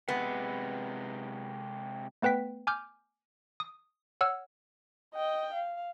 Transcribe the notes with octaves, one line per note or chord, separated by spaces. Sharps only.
C3 G#3 B3
A3 B3 B4 G5 B6
G#5 D6 F6 G6
D#6
C#5 F#5 E6 F6
D#5 G5
F5